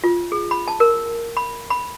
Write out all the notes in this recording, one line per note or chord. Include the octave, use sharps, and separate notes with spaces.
F4
G#4
B5
A5
A#4
B5
B5